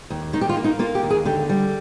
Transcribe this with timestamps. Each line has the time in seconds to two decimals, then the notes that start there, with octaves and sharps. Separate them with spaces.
0.10 D#2
0.33 D#3 D#4
0.41 G4
0.49 F4
0.57 A#3
0.64 D#4
0.79 A#3 F4
0.95 G4
1.03 D#2
1.10 G#4
1.25 D3 G4
1.49 G3